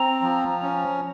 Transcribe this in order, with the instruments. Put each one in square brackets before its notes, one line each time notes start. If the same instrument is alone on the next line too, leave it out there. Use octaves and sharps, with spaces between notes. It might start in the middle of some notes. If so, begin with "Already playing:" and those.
Already playing: [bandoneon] C4 [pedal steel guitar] A#5
[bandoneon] F3
C#4